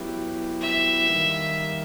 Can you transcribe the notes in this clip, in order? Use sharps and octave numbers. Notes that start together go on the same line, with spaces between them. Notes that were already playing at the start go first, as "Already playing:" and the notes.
Already playing: F#3 B3 E4 G4
E5
D#3 G3 A#3